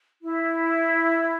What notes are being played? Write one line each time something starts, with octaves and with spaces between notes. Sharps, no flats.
E4